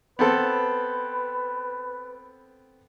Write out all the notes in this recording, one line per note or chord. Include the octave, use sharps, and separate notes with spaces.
B3 C4 A4 B4